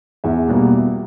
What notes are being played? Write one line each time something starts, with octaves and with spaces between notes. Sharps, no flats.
E2 E5
B2 G3 A#3